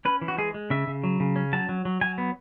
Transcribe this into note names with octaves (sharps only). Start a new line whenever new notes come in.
C#4 B4
E3
F#4
G#3 G#4
G#3
C#3 E5
C#3
F#3
C#3
C#4
F#3 A5
F#3
F#3
F#3 G#5
B3